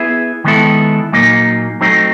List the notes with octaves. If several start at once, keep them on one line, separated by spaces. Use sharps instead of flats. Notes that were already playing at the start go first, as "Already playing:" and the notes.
Already playing: B3 E4 G#4 B4 E5
D#3 G#3 B3 E4 A4
A#2 F#3 A#3 D#4
F#3 A3 C4 D#4